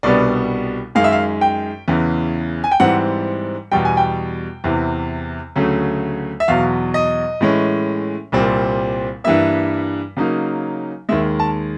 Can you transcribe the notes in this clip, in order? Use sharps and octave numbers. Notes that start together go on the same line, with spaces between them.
C2 B2 G3 B3 D4 D5
F#2 D#3 G#3 F5
E5
F5
G5
E2 C#3 E3
G#5
G5
G#2 E3 G3 C4 F#5
E2 B2 G3 G5
G#5
G5
E2 C3 E3
D2 C#3 F#3 A3
E5
E2 B2 F#3 F5
D#5
A2 E3 G#3 C#4
C2 A#2 G3 C4
G2 E3 G3 A#3 E5
C#3 F#3 A#3 D#4
D#2 D#3 G#3 E5
A5